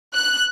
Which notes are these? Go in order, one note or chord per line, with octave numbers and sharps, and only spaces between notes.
F#6